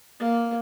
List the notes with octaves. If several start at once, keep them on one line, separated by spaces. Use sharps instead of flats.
A#3